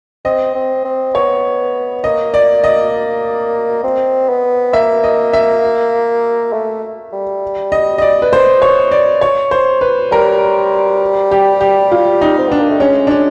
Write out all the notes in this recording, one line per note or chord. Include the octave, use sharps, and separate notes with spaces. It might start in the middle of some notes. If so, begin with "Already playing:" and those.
C4 D#5
C4
C4
B3 C#5
A#3 D#5
D5
D#5
C4
B3
A#3 E5
D#5
E5
A3
G3
D#5
D#5
D5
B4
C5
C#5
D5
C#5
C5
B4
G3 A#4
G4
G4
F4
D#4
C4
B3 D4
A#3
A3
G#3 C#4
D4
C#4